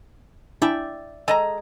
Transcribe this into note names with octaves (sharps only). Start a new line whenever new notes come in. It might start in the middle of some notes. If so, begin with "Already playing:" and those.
D4 E4 D5 E5 G5 G#5
G#3 A4 D#5 G#5 A#5